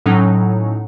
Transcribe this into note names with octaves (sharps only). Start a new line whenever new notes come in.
A2 F#3 C#4 D#4